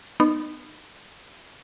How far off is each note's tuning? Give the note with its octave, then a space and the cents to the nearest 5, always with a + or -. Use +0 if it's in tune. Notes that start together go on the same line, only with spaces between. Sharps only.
B3 +10 D#4 -30